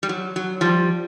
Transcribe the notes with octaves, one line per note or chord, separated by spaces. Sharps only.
G3
F#3
F#3
F3 G3